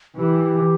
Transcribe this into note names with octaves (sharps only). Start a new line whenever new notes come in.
E3 G4